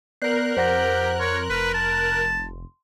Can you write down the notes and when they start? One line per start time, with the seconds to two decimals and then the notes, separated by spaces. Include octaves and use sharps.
0.22 B3 A#4 D5 F#6 G6 C7
0.57 F2 G4 C5 F#5 A#6
1.20 C#5 C6
1.50 F1 B4
1.74 A5